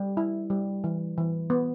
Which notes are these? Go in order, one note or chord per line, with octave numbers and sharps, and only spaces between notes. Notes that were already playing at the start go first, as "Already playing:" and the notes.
Already playing: G3
E4
G3
E3
E3
B3